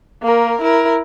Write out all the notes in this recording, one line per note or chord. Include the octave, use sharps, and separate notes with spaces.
A#3 A#4
E4 A#4